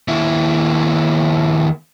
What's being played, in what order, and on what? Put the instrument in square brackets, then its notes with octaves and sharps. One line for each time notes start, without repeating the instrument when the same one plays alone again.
[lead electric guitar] D#2 E4